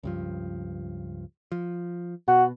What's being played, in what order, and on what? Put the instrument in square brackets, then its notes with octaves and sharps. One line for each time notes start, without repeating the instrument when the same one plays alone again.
[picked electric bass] C#2 G2 F3
F3
[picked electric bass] B2 [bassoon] F#4